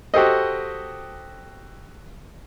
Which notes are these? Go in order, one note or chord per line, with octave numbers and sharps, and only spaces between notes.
F#4 G4 A4 C5 D#5